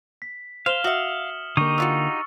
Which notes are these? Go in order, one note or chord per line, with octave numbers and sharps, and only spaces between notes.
B6
C5 F5 F6 E7 G7
F#4 E5 D#6 C#7 F#7
D3 A#3 D#4 G4 C#6 D#6
D4 F4 F#4 E6 A6 C#7